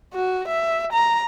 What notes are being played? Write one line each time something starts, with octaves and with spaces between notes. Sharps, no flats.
F#4
E5
A#5